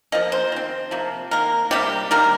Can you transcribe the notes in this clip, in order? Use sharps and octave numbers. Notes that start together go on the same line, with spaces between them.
F3 A#3 D#5
C5
D#3 C4
C3 F3 A#3
D#3 A#3 A#4
C3 G3 A#3 G4
D#3 G3 A#3 A#4